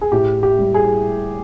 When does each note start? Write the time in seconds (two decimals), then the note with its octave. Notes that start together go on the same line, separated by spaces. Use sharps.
0.01 G#4
0.12 A2 G4
0.43 G4
0.58 G3
0.74 G#4